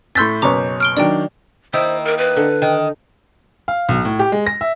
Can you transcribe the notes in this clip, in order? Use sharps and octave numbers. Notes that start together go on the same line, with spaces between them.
A2 C6 E6 G6 A6 B6
F#1 B2 C#5 A#5 D6
F6 D7 G7
D#3 F#3 D4 D5 G5
D#3 A#3 E4 C5
A#4
B4
D3
D#3
F5
B1
A2
G4
G#3
A#6
E5